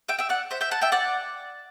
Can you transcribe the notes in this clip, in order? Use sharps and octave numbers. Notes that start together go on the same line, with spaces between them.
E5 G5
E5 G5
D5 F#5
C5 E5
E5 G5
F#5 A5
E5 G5
D5 F#5